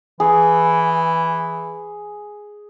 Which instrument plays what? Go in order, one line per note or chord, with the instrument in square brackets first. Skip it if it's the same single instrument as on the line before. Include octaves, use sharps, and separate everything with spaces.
[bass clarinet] E3 [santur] G#4